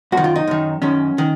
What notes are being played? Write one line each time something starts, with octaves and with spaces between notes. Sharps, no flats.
F#2 F#4
D#3
F4
D#4
F#2 D#3
F#2 D#3 C#4
D#3